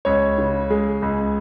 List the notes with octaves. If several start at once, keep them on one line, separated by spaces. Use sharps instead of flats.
C#2 C#5
C#3
G#3
C#2